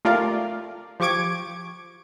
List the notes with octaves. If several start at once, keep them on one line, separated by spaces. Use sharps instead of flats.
A3 F4 G4 A#4 D5 F5
F3 G4 C#6 D6 G#6 D7